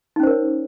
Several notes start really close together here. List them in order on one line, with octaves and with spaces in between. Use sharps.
D#4 C#4 C5 A#4 C#5